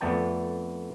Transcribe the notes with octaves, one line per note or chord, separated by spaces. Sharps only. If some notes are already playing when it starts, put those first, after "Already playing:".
F2 A3 B3 D5 G5 A5